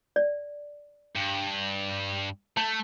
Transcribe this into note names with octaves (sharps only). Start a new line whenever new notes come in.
D5
G2
A3 A5